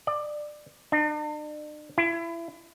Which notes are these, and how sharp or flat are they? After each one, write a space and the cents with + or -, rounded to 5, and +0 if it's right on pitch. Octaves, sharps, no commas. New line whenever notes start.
D5 +25
D4 +45
E4 +30